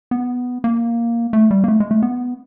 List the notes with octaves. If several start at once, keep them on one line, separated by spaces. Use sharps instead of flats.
B3
A#3
A3
G3
A#3
A3
G#3
A3
B3